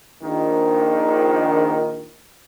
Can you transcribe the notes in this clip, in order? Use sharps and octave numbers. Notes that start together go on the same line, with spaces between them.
A#1 D#3